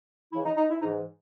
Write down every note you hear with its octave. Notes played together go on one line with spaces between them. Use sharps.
C#2 C#3 E3 E4
D#4
D#4
E4
G#2 E3 D#4